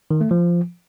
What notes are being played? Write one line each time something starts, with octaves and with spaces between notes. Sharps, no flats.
D#3
A3
F3